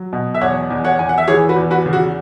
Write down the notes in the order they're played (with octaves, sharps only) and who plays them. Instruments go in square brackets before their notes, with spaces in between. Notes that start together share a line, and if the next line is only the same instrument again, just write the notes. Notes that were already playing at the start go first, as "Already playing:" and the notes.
Already playing: [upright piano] F#3
B2
E5
E2 C#5 F#5
E2
C#5 F#5
E2 G#5
F#5
E5
E3 G#4 C#5
F#4 B4
E2
F#4 B4
C#3
F#4